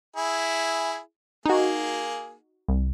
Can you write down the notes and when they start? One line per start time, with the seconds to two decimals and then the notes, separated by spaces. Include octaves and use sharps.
0.16 E4 G#4
1.46 A#3 D#4 F#4 G#4
2.68 C2